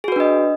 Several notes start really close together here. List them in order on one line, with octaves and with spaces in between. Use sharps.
G#4 F#4 B4 D4 D#5